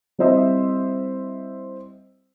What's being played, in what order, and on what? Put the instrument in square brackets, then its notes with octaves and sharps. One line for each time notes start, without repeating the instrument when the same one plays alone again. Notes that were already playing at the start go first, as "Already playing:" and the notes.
[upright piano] G3 C4 E4 C5 D#5 E5